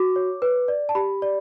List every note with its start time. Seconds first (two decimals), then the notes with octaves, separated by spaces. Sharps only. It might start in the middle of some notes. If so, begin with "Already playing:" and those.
Already playing: F#4 D6
0.16 C#5
0.42 B4
0.68 D5
0.89 A5
0.95 G4 B5
1.22 D5